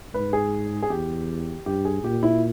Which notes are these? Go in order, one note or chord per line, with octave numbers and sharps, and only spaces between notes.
G#2 B4
G#4
G#4
E2 G4
G2 G4
G#4
A#2 G4
E4